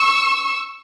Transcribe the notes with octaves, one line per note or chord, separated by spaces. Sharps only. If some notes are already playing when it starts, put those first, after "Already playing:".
Already playing: C#6 E6